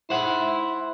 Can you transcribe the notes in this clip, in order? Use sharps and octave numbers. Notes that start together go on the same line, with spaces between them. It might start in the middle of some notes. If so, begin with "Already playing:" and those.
E4 C5 F#5